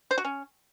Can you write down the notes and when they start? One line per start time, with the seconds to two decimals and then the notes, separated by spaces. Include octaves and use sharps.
0.11 C5
0.18 F#4
0.25 C#4